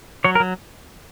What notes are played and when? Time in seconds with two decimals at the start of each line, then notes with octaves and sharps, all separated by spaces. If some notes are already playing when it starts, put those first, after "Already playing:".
0.24 F#3 C#5
0.35 A#4
0.40 F#3